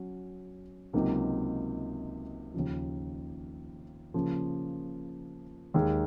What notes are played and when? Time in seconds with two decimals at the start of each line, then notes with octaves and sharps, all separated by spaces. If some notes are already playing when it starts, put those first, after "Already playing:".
Already playing: F#3 C#4 F#4
0.93 C#2 C3 F#3 A#3 D#4
2.54 D#2 C#3 F3
4.14 C#3 F3 A#3
5.74 D#2 D#3 G#3 D#4 G#4